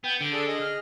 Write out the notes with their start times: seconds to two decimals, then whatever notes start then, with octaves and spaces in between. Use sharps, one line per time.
0.04 B3 G5
0.20 D3 D7
0.33 D4 G#4 A4
0.48 G#4 D#5
0.61 F6